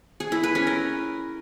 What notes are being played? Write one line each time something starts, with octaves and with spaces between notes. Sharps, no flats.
G#4
E4
B4
C#4
A#4